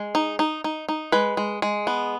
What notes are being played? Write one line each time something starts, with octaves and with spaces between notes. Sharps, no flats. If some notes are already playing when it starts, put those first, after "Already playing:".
Already playing: G#3
D#4
D#4
D#4
D#4
G#3 B4
G#3
G#3
B3